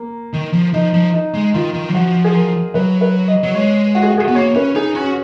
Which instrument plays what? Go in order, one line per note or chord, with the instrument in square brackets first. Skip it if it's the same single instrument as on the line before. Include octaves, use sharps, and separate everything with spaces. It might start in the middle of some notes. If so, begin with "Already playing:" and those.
Already playing: [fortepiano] A#3
[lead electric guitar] D#3
F3
[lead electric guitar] F3 [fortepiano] D#4
[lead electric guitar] F3
[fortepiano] D#4
[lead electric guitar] G#3
[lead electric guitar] D#3 [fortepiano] F4
[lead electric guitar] D#3
F#3
[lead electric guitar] F3 [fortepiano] F#4
[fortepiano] G#4
A#4
[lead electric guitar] F#3 [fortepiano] B4
[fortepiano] B4
D#5
[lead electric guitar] F#3
[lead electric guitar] G#3 [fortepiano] C#5
[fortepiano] F#4
G#4
F#4
G#4
[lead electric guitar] B3 [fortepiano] F#4
[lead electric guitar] A#3 [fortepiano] C#5
[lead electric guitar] C#4 [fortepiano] B4
[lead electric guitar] D#4 [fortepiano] G#4
[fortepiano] C#4 [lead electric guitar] F#4